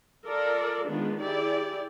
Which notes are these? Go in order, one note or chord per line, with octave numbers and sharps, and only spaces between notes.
F4 A4 A#4 D5
D#3 G#3 B3 D4 F4
E4 G4 G#4 D5